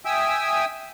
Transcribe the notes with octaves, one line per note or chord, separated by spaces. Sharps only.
E5 G5 G#5 D#6 E6